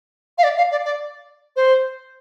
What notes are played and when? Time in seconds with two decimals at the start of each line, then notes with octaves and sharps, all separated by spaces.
0.38 F5
0.44 D5
0.58 F5
0.71 D5
0.85 D5
1.56 C5